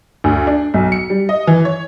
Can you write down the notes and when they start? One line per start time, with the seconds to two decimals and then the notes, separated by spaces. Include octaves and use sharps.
0.24 D2
0.47 D4
0.74 B1
0.92 C#7
1.10 G3
1.29 D#5
1.47 E3
1.65 C#5